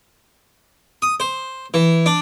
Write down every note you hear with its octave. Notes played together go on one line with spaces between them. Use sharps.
D#6
C5
E3
D4